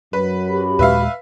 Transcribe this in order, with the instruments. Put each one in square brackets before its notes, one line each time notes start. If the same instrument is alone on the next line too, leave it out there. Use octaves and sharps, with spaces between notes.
[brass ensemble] F#2 F#3 [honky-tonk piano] B4
[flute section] F#4 G4 B5
[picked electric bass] D#2 A#2 G#3 [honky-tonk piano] B4 E5 F5